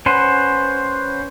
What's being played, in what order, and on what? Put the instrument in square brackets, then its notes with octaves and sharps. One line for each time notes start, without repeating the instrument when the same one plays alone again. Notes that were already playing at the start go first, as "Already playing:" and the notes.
[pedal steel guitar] C#4 B4 C5 F#5